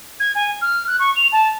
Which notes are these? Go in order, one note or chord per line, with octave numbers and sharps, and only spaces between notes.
G#6
G#5
F6
F#6
C#6
F7
A5